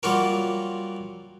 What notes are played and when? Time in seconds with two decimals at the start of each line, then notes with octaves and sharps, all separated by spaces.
0.03 F#3 G3 A#3 F4 F#4 A#4